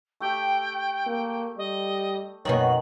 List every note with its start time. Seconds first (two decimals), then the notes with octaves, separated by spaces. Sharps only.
0.20 A3 G4 G5
1.07 A#3
1.58 G3 D#5
2.45 F#2 B2 D#3 B3 C#5 G#5 F#7